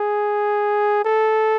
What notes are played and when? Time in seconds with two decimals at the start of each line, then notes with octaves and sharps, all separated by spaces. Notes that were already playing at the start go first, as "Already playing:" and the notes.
Already playing: G#4
1.05 A4